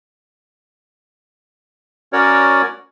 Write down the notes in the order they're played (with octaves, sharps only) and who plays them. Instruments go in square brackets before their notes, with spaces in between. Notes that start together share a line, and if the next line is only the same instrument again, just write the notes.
[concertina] C#4 F#4 A#4 C#5 D5